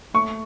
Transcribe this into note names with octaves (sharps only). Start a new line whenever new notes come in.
A3 C#6